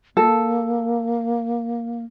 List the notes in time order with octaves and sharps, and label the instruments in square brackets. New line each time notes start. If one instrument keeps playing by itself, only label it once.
[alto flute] A#3 [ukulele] A4